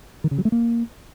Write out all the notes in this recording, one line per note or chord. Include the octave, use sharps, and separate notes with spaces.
D#3
C#3
F#3
A3
A#3